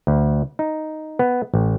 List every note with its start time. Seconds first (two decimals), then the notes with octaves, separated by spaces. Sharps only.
0.07 D2
0.59 D#4
1.19 B3
1.54 A1